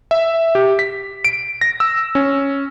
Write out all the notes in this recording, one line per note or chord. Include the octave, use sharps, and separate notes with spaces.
E5
G4
B6
D7
A#6
E6
C#4